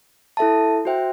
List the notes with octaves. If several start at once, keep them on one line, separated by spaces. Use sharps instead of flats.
E4 A4 E5 A5
F#4 C5 E5 G5